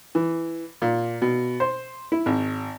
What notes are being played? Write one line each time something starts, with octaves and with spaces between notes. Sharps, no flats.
E3
A#2
B2
C5
E4
G#1